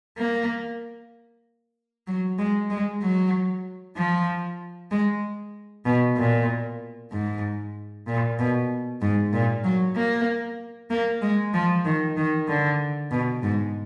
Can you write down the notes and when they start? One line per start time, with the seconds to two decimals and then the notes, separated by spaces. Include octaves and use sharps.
0.18 A#3
2.07 F#3
2.38 G#3
2.70 G#3
3.02 F#3
3.97 F3
4.91 G#3
5.85 B2
6.17 A#2
7.12 G#2
8.07 A#2
8.38 B2
9.01 G#2
9.33 A#2
9.64 F#3
9.96 A#3
10.90 A#3
11.22 G#3
11.54 F3
11.85 D#3
12.17 D#3
12.48 D3
13.11 B2
13.43 G#2